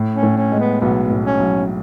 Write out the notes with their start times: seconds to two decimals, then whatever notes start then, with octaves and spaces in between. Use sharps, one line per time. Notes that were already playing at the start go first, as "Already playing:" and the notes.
Already playing: A2
0.15 C#4
0.23 A2
0.37 C#4
0.52 G#3
0.59 B3
0.81 B1 B3
1.10 A2
1.25 C#4
1.40 B1